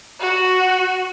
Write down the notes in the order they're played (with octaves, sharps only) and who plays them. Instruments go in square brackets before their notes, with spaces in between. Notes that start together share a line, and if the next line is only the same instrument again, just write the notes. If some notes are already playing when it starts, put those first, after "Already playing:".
[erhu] F#4